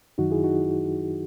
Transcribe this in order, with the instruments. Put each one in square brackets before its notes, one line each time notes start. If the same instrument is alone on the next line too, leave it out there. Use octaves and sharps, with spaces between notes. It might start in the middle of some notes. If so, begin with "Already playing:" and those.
[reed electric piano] F#2 D#3 F#3 D#4 F#4
E4 G#4
D#4 F#4